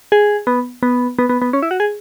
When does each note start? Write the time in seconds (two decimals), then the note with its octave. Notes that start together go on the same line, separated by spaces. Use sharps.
0.12 G#4
0.47 B3
0.83 B3
1.19 B3
1.29 B3
1.42 B3
1.53 C#4
1.62 E4
1.71 F#4
1.80 G#4